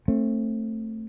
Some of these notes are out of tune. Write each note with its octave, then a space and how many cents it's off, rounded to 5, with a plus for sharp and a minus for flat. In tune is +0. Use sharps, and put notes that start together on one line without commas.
A3 +15 C4 +30